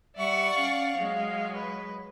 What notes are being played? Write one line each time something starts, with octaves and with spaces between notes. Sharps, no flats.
G3 D5 E5 F#5 C#6
C#4 F5
F#3 G#3
B4